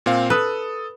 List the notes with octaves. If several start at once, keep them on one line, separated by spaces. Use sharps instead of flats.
A#2 C4 F5
A4 B4 D#6